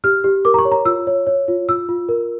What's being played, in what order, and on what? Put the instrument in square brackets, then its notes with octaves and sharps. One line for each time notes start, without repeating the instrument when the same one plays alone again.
[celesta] G4 F6
G4
A#4 D6
A#5
C#6
C#5
A#5
F4 E6
C#5
C#5
F4
F4 E6
F4
A#4